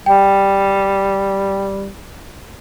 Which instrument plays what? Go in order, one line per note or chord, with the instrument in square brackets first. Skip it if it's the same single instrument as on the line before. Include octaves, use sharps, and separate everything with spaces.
[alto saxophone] G3 [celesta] G5